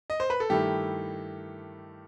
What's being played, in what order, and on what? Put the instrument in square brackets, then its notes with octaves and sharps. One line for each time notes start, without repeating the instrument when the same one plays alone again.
[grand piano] D#5
C5
B4
A4
G2 D#3 A3 E4 G4